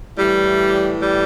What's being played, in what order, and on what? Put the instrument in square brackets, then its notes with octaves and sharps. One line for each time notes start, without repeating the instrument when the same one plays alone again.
[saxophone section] A2 E3 G3
G3